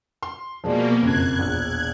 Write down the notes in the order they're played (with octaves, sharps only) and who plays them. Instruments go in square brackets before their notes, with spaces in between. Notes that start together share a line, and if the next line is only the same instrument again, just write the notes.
[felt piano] C6
[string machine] B2 A#3 [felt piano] F3 G#3 D5
[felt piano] F#1 F2 [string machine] F#6 G#6
[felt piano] E1 A#1